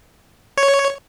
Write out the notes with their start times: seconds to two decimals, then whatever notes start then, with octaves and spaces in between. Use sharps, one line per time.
0.57 C#5